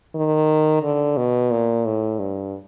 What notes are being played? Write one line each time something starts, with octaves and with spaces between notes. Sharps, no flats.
D#3
D3
B2
A#2
A2
G2